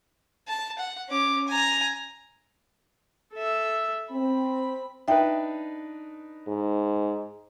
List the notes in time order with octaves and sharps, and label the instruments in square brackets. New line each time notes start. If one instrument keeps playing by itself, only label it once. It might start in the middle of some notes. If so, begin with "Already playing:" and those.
[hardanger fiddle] A5
F#5
C#4 D6
G#5 A#5
[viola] A4 E5
[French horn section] C4 [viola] B5
[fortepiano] D4 D#4 B4 [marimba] E5 G5
[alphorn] G#2